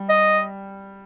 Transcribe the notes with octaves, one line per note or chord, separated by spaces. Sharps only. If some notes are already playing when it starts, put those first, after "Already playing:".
Already playing: G3
D#5